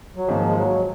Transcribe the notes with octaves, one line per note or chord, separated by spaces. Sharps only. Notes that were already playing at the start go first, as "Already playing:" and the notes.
F#3
G#2 D#3 F3 A#3 F4 A#4
G#3
F#3